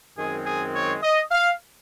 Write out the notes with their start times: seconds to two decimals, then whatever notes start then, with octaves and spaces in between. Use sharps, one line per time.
0.18 F#2 D#3 G#3 C4 G#4
0.46 G#4
0.74 C#5
1.02 D#5
1.32 F5